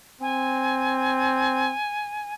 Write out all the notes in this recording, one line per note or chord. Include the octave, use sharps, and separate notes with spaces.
C4 G#5